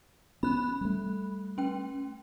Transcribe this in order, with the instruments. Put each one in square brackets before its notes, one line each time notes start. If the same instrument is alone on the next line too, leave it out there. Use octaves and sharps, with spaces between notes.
[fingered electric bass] B3 C#4 [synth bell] B5 F#6
[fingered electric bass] G3 A3
[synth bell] C#4 G5